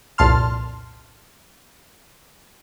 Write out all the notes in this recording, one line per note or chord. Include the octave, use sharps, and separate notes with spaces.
C2 F2 A#2 A5 C6 F6